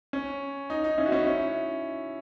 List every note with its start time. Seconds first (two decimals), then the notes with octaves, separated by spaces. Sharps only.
0.13 C#4
0.70 D#4
0.84 D#4
0.98 C#4 E4
1.06 F#4
1.12 C#4 E4
1.27 C#4 E4